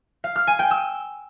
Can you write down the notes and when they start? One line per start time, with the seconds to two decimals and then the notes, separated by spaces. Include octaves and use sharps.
0.24 F5
0.36 F6
0.47 G#5
0.59 G5
0.71 E6